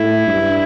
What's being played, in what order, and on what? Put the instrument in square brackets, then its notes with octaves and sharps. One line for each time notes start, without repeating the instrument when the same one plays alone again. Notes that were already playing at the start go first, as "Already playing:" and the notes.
Already playing: [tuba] A2 [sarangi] E4
[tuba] G2